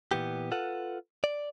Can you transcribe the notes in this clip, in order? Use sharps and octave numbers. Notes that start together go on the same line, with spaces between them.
A#2 E3 B3 G4
F4 A4 B4 F#5
D5